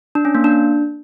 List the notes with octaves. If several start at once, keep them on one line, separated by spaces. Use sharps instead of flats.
D4
C#4
A#3
D4